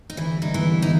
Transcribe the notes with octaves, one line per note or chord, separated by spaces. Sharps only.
D#4
D3 E3 E4
G3
D#4
E3 B3 E4
B3
D#4